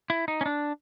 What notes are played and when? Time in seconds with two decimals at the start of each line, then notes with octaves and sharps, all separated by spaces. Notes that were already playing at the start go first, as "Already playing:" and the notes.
0.10 E4
0.28 D#4
0.41 C#4
0.46 D4